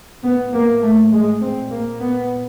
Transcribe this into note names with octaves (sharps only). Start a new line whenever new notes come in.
A2 B3
A#3
A3
G#3
A#2 C4
A#3
B3